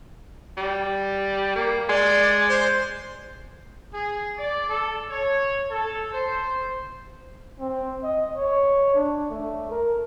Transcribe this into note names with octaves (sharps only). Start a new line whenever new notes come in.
G3
A#3
G#3 D5
C5
G#4
D5
A4
C#5
A4
C5
C4
D#5
C#5
D4
A3
A#4